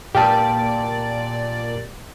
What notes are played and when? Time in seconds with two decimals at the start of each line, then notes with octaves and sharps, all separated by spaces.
0.15 A#2 G4 D5 F5 A5